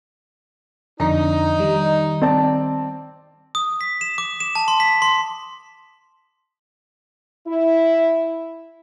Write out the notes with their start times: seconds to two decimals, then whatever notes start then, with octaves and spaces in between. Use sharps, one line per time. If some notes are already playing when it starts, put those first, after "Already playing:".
1.00 F2 D3 D4 D#4 A#5
1.58 D#3 G3
2.21 C4 D5 A5
3.55 D#6
3.81 B6
4.01 E7
4.18 D6
4.40 E7
4.55 A5
4.68 C6
4.80 B6
5.02 C6
7.47 E4